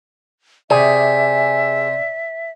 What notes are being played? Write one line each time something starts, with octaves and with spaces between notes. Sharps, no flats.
C3 G#4 D5 E5